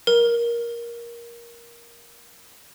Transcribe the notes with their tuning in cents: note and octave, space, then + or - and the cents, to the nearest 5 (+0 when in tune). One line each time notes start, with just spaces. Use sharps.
A#4 +15